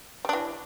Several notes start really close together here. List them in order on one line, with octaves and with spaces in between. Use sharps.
G3 D4 E3